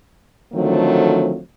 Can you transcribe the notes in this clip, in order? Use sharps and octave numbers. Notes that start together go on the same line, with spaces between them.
D3 D#3 F3 F#3 A3 C4